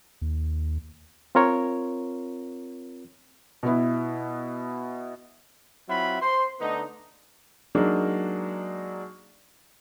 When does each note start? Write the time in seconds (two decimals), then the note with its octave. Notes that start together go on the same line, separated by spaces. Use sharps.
0.22 D#2
1.35 C4 F4 A#4 C#5
3.63 B2 B3 E4
5.89 F#3 C4 E4 F4 F#5 B5
6.22 C5 C6
6.61 D3 A3 B3 D#4
7.75 F#3 G#3 A#3 D4 D#4